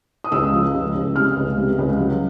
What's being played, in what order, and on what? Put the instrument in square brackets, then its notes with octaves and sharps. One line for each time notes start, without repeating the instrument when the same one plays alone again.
[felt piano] D#6
C#2 E6
F3
C#2
C#2
C3 F6
C#2
C3
C#2
F#3